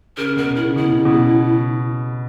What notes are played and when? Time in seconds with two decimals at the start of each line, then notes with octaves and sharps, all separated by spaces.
0.17 C#3 A#4
0.36 B2 A#4
0.56 C#3 E4
0.76 B2 E4
0.91 C#3
1.05 B2